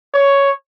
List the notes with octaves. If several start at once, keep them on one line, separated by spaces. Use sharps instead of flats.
C#5